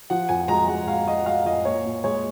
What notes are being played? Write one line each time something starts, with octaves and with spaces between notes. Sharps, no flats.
F3 F#5
F2 G#5
G#3 A#5
G#3 F#5
G#3 F5
G#3 D#5
F#5
G#3 F5
F2 D#5
A#2 C#5
A#2
G#3 C#5